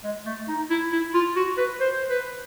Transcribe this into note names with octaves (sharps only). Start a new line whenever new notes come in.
G#3
A3
D#4
E4
E4
F4
F#4
B4
C5
B4